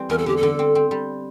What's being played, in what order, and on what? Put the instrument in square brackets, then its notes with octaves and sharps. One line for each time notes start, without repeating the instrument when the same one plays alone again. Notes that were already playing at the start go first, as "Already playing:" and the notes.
Already playing: [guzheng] E3 G3 C4
[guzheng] E2 [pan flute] A#4
[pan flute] A4
[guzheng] D3 [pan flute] G4
[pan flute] A4
[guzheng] D3
C4
C4
G3